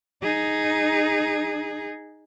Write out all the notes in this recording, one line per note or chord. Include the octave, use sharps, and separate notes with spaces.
D#4 G#4